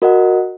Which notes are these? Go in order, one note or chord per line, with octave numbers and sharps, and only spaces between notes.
F#4 A#4 D#5 F#5